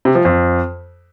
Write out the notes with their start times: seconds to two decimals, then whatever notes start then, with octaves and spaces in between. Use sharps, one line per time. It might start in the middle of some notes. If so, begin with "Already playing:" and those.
0.05 C3
0.15 F3
0.25 F2